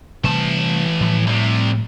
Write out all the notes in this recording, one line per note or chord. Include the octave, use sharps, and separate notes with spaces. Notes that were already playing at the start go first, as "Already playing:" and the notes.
C3 E3 G3 A3 A5
A2 F3 G3
C2 C3